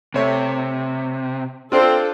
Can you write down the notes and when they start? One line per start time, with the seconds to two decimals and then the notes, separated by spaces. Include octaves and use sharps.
0.14 C3 A3 C#5 E5
1.72 C4 D4 F4 A4